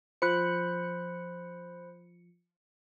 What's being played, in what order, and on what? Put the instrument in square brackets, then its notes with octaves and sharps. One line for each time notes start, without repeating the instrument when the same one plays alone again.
[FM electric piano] F3 C#7 [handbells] C5 B5 F#6